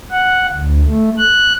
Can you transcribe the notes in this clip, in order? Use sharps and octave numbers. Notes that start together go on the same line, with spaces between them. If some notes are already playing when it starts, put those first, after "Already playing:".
F#5
D2
A3
F#6